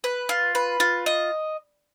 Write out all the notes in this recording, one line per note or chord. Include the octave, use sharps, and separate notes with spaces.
B4
F4
B4
F4
D#5